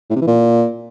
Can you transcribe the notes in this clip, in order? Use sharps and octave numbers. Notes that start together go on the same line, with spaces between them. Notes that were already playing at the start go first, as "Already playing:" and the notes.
A2
C3
E3
A#2